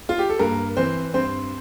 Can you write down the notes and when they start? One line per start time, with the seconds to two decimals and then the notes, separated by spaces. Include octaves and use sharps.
0.09 F4
0.19 G4
0.29 A4
0.39 G2 A#3 A#4
0.77 E3 C4 C5
1.14 G2 C4 C5